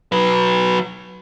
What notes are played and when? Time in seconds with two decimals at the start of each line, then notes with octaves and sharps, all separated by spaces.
0.12 F#3 B4